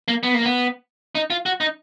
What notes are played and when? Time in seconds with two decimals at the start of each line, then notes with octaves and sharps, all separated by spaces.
0.08 A#3
0.23 B3
0.34 A#3
0.45 B3
1.15 D#4
1.30 F4
1.46 F#4
1.60 D#4